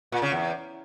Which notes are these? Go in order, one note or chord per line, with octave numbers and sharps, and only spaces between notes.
A#2
C#3
E2